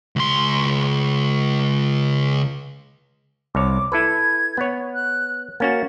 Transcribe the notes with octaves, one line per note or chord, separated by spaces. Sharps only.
C#2 C6
C2 C#5 D6
E4 A4 B4 G#6
B3 C#5
F#6
A#3 C#4 F#4 A6